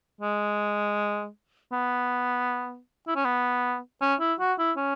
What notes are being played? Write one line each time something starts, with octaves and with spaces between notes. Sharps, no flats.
G#3
B3
E4
C#4
B3
C#4
E4
F#4
E4
C#4